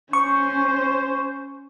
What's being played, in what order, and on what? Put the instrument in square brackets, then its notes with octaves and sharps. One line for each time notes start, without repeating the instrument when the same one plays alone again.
[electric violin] C#4 C5 [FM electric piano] C#6